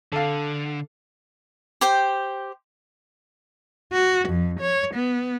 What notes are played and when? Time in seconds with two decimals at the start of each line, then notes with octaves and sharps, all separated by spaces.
0.13 D3 A4 F5
1.81 G4 C5 G5
3.92 F#4
4.29 F2
4.61 C#5
4.95 B3